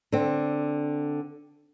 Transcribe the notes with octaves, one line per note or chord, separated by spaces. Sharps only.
D3 C4